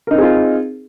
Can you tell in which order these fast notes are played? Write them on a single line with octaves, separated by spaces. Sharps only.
A#4 D#4 C4 G#4 F4